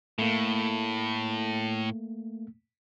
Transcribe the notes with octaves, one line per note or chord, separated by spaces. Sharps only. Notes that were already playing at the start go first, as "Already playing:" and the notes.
A2 A3 A#3